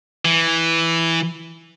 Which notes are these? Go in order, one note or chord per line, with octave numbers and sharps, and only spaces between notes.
E3